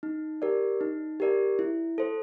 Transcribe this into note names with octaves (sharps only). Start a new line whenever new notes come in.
D#4
G4 A#4 D5
D#4
G4 A#4 D5
E4
A4 C5